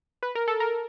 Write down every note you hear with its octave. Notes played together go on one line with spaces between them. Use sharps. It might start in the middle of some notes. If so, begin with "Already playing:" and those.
B4
A#4
A4
A#4